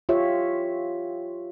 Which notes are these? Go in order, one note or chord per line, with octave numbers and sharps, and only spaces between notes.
F4 G4 C#5 E5